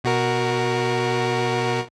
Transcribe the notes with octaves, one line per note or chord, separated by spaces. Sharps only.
B2 F#4 A#4